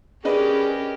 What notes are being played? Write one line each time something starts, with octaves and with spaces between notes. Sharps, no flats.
C#4 D4 G4 G#4 A#4 B4 D#5